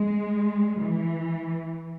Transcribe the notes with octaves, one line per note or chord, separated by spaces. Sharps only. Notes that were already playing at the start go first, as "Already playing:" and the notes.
Already playing: G#3
E3